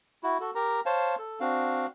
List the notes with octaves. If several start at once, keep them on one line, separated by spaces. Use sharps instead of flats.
E4 F#4
F#4 A4
G4 A#4 A#5
C5 C#5 F5 A5
A4
C4 D4 F#4 F5